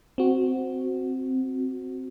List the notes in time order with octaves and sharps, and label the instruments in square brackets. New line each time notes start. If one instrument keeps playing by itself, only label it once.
[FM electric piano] C4 F#4